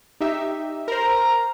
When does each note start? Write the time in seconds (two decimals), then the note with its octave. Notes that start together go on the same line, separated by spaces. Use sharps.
0.20 D#4 G4 E5
0.88 A#4 C5 A#5